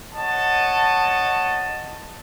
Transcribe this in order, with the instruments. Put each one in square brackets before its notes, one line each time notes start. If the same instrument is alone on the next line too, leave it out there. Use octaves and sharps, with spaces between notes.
[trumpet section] C#5 D#5 F#5 A5